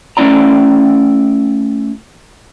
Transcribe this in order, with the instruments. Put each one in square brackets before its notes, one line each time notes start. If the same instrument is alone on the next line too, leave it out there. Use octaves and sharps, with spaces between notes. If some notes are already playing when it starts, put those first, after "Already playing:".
[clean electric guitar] A3 A#3 C#4 E4 D5 A#5